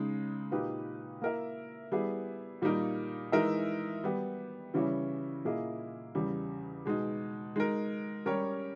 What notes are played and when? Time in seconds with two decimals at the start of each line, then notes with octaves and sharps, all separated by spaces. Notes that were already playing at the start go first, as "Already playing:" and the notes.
Already playing: C#3 G#3 D#4
0.51 A#2 A#3 D#4 G4 B4
1.22 A#3 E4 A#4 E5
1.92 G3 B3 E4 G#4
2.62 A#2 G3 A#3 D#4 A#4
3.32 E3 G#3 D#4 A#4 E5
4.04 G3 B3 G4
4.74 C#3 E3 G3 C#4 E4
5.45 A#2 A#3 E4 G#4 D#5
6.15 E2 C#3 G3
6.86 B2 G#3 D#4
7.56 G#3 D#4 A#4
8.26 G3 C#4 G4 A#4 C#5